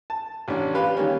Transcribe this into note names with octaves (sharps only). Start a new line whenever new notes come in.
A5
A1 C#4 D4
F4 G4 B4 F5
D#3 G3 A#3 C#4